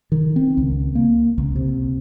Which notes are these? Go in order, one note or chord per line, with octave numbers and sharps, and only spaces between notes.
D#3
C4
C#2
A#3
C#2
C3